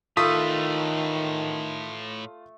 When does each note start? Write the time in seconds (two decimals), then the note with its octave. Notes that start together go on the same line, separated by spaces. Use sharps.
0.17 A2 D#3 A3 F4 B4 D#6 B6